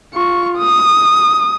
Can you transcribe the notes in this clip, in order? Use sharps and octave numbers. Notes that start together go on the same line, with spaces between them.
F4 C#6
D#6